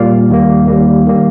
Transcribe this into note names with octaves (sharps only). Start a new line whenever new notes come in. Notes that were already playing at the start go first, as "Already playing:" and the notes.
Already playing: A#2 G3 A#3 D5 F5
D#2 D#3 G3 A#3
D#2 D#3 G3 A#3
D#3 G3 A#3